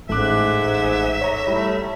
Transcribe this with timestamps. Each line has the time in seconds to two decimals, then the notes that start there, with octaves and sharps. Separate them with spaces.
0.09 A1 G#2 A3 E5 D6 F#6
1.21 C#5 A#5
1.46 G3 A3 E4 G4